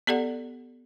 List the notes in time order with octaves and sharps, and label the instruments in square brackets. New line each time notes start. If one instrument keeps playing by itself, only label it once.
[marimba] B3 G4 A4 D5 F#5